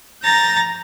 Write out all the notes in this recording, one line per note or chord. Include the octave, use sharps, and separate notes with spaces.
A#5 G6 A6 A#6